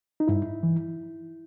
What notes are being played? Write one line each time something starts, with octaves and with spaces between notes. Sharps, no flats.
D#4
G2 E4
E3